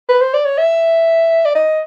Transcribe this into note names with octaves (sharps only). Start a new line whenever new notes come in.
B4
C5
D5
C#5
E5
D5
D#5